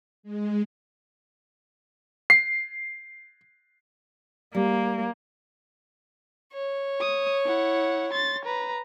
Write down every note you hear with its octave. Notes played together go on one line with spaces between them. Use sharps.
G#3
C7
G3 A#3
C#5
D#6
E4 F#5
C6 A6
B4 A#5